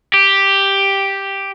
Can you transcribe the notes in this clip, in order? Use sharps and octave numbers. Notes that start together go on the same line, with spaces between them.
G4